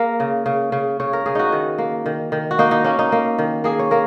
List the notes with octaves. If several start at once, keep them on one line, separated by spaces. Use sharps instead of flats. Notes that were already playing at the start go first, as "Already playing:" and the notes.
Already playing: A#3 G#4 A#4
C#3
C#3
C#3
C#3 C#5
A#4
C#3 G#4
D#4 F#4
D#3
A#3
D#3
D#3
F#4
A#3 D#4
D#4
A#3 C#4
D#4
A#3
D#3
A#3 G#4
C#5
A#3 A#4